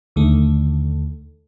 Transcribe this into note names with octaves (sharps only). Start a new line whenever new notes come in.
D#2 D3 A3